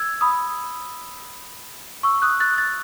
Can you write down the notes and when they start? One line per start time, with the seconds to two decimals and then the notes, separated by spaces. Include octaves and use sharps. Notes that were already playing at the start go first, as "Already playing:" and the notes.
Already playing: E6 G#6
0.21 B5 D#6
2.03 C#6 E6
2.22 D#6 F#6
2.40 F#6 A6
2.58 F#6 A6